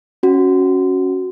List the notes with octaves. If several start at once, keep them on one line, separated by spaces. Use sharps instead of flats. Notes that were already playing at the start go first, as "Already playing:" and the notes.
C#4 F#4